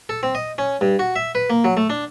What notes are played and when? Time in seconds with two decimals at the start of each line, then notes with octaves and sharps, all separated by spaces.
0.09 A4
0.23 C4
0.35 D#5
0.58 C#4
0.81 G2
0.99 F#4
1.16 E5
1.35 B4
1.50 A#3
1.64 F#3
1.77 A3
1.90 D4